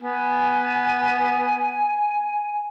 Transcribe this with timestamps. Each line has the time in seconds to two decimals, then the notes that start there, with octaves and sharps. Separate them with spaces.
0.02 B3 G#5